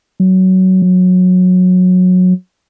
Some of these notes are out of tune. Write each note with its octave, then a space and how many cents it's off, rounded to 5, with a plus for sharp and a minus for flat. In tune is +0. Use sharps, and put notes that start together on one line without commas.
F#3 +15
F#3 -20